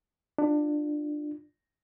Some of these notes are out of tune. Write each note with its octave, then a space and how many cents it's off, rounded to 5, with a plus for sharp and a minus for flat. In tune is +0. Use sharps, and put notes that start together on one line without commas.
D4 +20 F4 +0